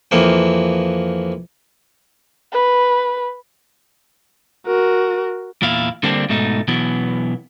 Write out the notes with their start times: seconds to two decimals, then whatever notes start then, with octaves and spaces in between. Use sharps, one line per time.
0.11 F2 E3 F3 A#3 G5
2.52 B4
4.66 F#4 A#4
5.62 E2 A#2 E4 F5
6.03 D3 G3 A#3 C4 D4
6.29 G#2 B2 A3 D#4
6.68 B2 E3 F#3 B3